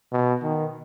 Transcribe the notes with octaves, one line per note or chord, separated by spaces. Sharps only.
B2
D#3